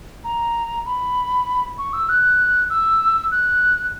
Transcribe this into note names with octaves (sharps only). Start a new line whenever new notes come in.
A#5
B5
C#6
E6
F#6
E6
F#6